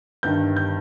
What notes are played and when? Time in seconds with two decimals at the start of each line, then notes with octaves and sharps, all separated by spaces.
0.23 G1 G2 D#3 G6
0.57 G6